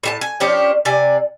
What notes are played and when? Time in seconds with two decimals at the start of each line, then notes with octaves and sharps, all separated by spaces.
0.03 A2 G4 A5
0.21 G#5
0.40 F3 C#4 D4 G4
0.85 C3 D5 G#5